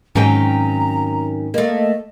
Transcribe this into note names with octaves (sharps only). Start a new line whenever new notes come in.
G#2 D#3 F#3 C4 C#4 D#4 G5 A#5
A3 A#3 D#5